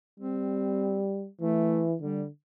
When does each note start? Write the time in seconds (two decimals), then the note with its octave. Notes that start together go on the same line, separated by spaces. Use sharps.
0.19 G3 C4
1.41 E3 A3
2.01 D3 G3